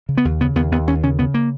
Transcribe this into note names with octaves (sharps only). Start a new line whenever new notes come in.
C#3
B3
D#2
C#3 B3
D#2 B3
D#2 B3
D#2 C#4
C#3 C#4
C#3 B3
A#3